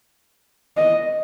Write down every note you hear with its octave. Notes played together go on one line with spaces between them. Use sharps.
D#5